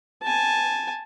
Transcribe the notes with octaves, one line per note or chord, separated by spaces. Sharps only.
G#5 A5